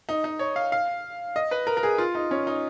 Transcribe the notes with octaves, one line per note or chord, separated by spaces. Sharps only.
D#4
D#4
C#5
F5
F5
D#5
B4
A#4
A#4
G#4
F4
D#4
C#4
D#4